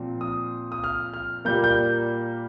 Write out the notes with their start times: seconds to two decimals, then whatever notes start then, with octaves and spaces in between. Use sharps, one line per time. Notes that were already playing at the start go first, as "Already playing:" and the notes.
Already playing: A#2 F3 C4
0.21 D#6
0.72 D#6
0.84 F6
1.14 F6
1.45 A#2 G3 A#3 G6
1.64 G6